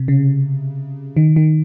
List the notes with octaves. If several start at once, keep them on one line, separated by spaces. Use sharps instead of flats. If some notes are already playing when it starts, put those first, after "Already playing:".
Already playing: C3
C#3
D#3
D#3